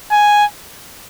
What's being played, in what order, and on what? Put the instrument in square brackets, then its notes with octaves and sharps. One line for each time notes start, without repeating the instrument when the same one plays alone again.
[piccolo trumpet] G#5